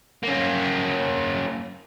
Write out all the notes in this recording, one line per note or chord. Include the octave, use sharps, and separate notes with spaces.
A#3 C#4